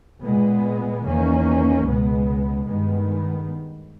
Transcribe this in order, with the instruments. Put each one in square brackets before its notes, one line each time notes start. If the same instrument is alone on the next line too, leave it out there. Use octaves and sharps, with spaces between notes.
[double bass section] A#2 G#3 B3
E2 D#3 A#3 C#4
C#2 B2 G#3 B3
G2 D#3 G#3 B3